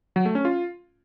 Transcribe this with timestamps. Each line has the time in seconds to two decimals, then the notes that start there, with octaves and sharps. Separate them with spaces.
0.16 F#3
0.25 A3
0.35 C#4
0.45 F4